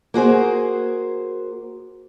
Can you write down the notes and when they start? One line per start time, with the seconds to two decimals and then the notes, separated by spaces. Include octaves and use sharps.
0.14 A#3 F#4 G#4 C5